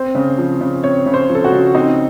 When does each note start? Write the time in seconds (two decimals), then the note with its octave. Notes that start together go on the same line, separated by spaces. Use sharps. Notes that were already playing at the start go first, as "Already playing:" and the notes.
Already playing: C4 C5
0.15 C#3
0.38 F3
0.61 C#3
0.83 C4 C#5
1.06 C#3
1.14 C5
1.29 F3
1.35 A4
1.45 F#4
1.52 C#3
1.75 C4 D#4